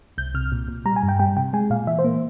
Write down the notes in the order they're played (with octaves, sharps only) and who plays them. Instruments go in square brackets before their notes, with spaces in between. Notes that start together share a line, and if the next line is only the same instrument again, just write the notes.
[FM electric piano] C2 G6
C3 F6
A#2
A#2
G3 A#5
G#5
G2
G5
G3 G5
C3 G5
G#3 G#5
A#2 F5
E3 E5
C5
A#3